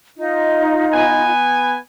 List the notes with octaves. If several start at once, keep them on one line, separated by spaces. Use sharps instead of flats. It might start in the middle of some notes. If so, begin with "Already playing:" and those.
D#4 F4 D#5
B3 B4 G#5